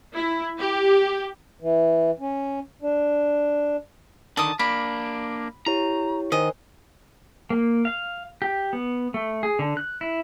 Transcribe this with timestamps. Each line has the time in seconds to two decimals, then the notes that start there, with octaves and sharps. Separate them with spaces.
0.14 E4
0.58 G4
1.61 E3
2.20 C#4
2.82 D4
4.37 D3 D#3 A5 D#6
4.59 A#3 D4 B5
5.66 E4 G4 C#5 A#5
6.32 D#3 A#4 C5 D#5 G#5
7.50 A#3
7.85 F5
8.42 G4
8.73 B3
9.14 A3
9.43 G#4
9.59 D3
9.77 F#6
10.01 E4